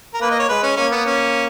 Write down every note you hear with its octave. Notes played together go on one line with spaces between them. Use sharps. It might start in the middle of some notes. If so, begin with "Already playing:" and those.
A#4
A#3 B4
D#5
C#5
G#3 B4
C#4
A#3 C#4
B3
C#4